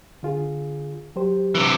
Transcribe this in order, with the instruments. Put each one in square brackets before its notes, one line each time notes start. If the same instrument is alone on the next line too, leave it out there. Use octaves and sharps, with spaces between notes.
[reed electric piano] D3 F4 G#4
F#3 G4 C5
[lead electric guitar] C3 E3